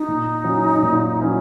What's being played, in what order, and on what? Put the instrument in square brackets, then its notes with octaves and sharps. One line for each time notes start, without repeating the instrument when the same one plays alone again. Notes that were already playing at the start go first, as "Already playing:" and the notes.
Already playing: [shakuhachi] D#4
[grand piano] A#2
F#3 C#4 E4
A#2
F#3 C#4 E4